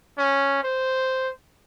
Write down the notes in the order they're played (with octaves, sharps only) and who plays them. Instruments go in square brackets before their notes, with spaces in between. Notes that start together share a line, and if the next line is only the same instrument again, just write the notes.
[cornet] C#4
C5